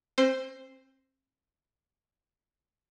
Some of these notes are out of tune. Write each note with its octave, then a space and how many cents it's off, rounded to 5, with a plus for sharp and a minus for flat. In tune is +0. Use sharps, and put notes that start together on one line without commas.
C4 +35 C5 -5